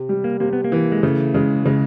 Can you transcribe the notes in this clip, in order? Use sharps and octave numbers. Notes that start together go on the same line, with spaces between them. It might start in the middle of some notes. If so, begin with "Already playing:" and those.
Already playing: C3
G3
A#3
C3 A#3
B3
A#3
E3
G#3
C#3 A3
C#3 G#3
C#3 G#3